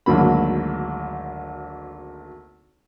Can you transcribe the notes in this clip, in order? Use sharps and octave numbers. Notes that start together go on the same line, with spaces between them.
G#1 D2 F#3 A#3 B5